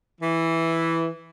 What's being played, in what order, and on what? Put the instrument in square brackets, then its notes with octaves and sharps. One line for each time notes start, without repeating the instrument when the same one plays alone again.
[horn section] E3